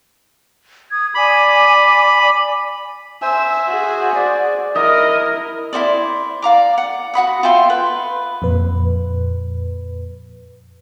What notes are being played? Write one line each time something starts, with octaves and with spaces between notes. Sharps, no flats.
D#6 G#6
D5 G#5 B5 D6
C5 E5 G#5 E6
F#4 G#4
D5
E4 A#4 D#5 D#6
E4 F#4 C5 D5
D5 F5 A#5 D6
F#5
F#4 F#5 B5 D#6
F4 E5 G5 C6
B4
F2 A#2 B4